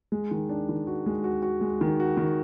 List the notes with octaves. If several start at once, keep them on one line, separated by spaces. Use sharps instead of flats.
G#3
D#3
D4
D#3
F#4
G#3
F#4
F#4
G#3
D#3
F#4
D#3